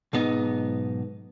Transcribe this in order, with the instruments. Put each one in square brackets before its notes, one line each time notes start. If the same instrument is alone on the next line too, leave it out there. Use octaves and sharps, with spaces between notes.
[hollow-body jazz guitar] B1 G#2 B3 D#4